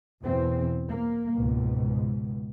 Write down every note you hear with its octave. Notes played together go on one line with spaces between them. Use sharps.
E2 B2 E3 C4
A#3
C#2 G#2 B2